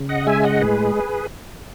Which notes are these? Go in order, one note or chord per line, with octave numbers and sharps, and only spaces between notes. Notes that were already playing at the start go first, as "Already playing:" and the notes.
Already playing: C#3
D#5 F#5
G#3 E5 G#5
D#5 F#5
A2 G#4 B4